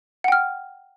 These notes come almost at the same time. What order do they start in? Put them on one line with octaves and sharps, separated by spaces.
F#5 G5 F6